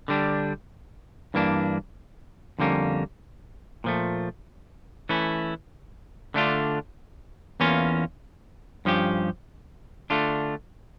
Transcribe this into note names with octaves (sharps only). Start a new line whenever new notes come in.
D3 G3 D4
G2 E3 A#3 D4
F2 D3 G3 A#3 C#4
A#2 F3 A3
E3 A3 C#4 E4
D3 A3 D4 F4
E2 E3 A#3 C#4 F4
G2 F3 C#4 G4
D3 A3 D4 F4